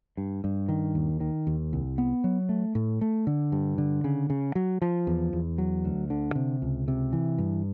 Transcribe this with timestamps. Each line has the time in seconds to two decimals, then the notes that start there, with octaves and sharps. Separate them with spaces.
0.17 G2
0.44 G2
0.69 D#3
0.95 D#2
1.20 D#3
1.47 D#2
1.73 C2
1.98 B3
2.24 F#3
2.49 A3
2.75 A2
3.01 A3
3.27 D3
3.52 G2
3.78 D3
4.04 C#3
4.30 C#3
4.55 F#3
4.82 F3
5.07 E2
5.33 E2
5.58 F#3
5.85 D2
6.10 D3
6.35 C3
6.62 C#2
6.88 C3
7.13 E3
7.38 G2